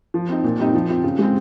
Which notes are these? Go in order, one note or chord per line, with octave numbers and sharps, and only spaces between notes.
F3
C4 D#4
A#2
G3 C4 D#4
F3
C4 F4
C#3
G#3 C4